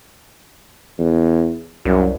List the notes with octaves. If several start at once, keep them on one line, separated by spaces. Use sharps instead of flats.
E2
C2 F#2